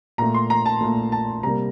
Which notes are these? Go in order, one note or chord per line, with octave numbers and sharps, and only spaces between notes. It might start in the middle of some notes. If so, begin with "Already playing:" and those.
A#2 A3 A#5
C6
A#5
A5
A#2 A3
A5
C3 G3 A#3 A#5